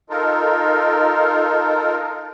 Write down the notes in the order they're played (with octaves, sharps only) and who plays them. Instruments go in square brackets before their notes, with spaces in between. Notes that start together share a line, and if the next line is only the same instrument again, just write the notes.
[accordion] D#4 F4 A4 A#4